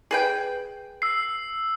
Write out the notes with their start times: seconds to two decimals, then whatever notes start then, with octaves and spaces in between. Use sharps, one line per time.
0.11 G#4 B4 G5
1.02 E6 C7